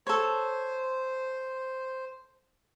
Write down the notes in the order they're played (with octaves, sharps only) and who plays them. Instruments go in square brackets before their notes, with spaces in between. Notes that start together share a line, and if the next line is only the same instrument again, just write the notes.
[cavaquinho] A4 C#5 [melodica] C5